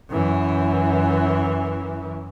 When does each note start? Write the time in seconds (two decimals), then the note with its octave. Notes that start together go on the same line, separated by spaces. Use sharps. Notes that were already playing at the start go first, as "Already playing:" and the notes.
0.10 F#2 E3